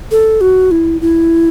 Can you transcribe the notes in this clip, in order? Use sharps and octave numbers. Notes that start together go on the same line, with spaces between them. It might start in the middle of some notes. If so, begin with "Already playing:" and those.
A4
F#4
E4
E4